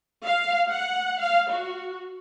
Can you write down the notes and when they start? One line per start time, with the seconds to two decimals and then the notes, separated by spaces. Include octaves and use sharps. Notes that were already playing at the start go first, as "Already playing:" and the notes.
0.24 F5
0.69 F#5
1.20 F5
1.50 F#4